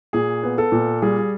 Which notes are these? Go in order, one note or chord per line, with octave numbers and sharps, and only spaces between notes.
A#2 G#4
B3
A4
A#2
G3 G#4